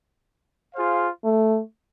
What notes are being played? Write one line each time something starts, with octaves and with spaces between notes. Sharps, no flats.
F4 G#4 C5 F5
A3